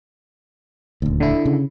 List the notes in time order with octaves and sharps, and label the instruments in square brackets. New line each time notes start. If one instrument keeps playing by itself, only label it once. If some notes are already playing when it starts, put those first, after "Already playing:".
[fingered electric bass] D#1 D2
[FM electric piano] D3 E4
[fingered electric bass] C#3